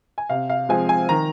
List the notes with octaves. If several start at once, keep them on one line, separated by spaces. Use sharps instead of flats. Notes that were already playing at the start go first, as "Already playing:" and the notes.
G#5
C3 F5
F5
F3 G#3 C4 G#5
G#5
D#3 A#5